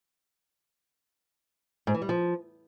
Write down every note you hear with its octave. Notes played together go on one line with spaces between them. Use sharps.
G#2
E3
G3
F3